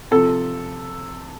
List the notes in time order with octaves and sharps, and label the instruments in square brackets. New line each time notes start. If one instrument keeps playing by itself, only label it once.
[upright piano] C3 F3 A4